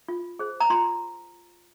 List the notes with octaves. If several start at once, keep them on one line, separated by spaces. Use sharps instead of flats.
F4
G#4 C5
A#5
F4 C6